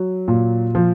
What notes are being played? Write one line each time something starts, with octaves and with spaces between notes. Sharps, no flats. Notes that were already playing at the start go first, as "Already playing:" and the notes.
Already playing: F#3
A#2
F3